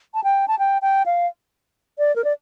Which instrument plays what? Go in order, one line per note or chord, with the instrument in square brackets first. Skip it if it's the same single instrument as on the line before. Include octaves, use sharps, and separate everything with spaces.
[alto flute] A5
G5
A5
G5
G5
F5
D5
A#4
D5